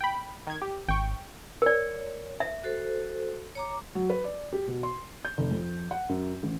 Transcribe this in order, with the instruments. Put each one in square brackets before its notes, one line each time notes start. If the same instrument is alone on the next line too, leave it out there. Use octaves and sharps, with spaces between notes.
[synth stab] G5 B5
D#3 G#6
G4
[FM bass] G#1 [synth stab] G5 C#6
[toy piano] A#4 D5 [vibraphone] C#5
[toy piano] E5
[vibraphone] F#4 A4 C5
C#5 A#5 D6
[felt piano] F#3
B4
D5
G4
B2
C6
G6
F1
F2
F#5
F#2
A1